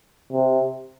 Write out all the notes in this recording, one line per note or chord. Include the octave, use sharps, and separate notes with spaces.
C3